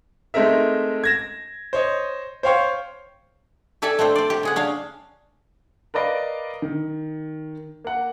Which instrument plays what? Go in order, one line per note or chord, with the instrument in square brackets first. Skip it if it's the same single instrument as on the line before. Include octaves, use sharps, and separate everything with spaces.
[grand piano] G#3 A3 C4 D#4 A#4 E5
G#6 A#6 E7
C5 C#5 D#5
C5 C#5 F5 G5 C6 C#6
[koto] G4 A4 D5 E5 G#5 A5
A3 C4 D4 C5
C5 D5
G4
C#3 G#4 F#5
C#4 D4 F5
[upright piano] A#4 B4 D5 D#5 F5
D#3
A#3 F#5